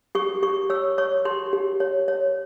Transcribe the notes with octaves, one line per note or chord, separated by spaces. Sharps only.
G4 C#6
G4 C#6
C#5 E6
C#5 C#6
G4 C6
G4
C#5
C#5